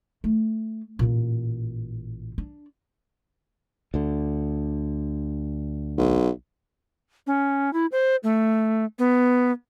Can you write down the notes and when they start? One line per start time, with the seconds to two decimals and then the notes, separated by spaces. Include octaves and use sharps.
0.24 A3
0.99 A1 A#2
2.38 D4
3.94 D2 D3
5.98 B1
7.27 C#4
7.73 E4
7.92 C5
8.24 A3
8.99 B3